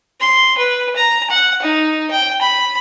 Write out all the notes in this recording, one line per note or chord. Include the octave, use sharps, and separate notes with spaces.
C6
B4
A#5
F#5
D#4
G5
B5